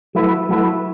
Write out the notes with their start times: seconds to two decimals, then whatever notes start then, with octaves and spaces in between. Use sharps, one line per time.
0.15 F#3 A3 E4 B4
0.49 F#3 A3 E4 B4